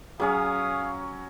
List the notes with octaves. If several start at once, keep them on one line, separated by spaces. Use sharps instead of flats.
F#3 C#4 G#4 C#5 F5 G#5 D#6